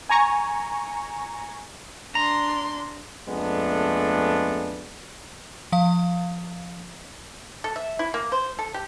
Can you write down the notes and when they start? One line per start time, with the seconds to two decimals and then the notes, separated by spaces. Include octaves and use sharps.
0.09 G#5 A#5 C#6
2.15 D4 A#5 C6
3.28 F2 G#3 A3 B3 D4
5.72 F3 F5
7.64 A4
7.76 E5
7.99 E4
8.14 A#3
8.32 C5
8.59 A4
8.74 G4